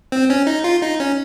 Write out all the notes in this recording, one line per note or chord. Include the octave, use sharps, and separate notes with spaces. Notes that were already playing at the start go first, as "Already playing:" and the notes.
C4
C#4
D#4
F4
D#4
C#4